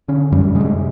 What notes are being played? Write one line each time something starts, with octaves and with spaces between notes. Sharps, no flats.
D3 C#4
F#2 G3
C3 G#3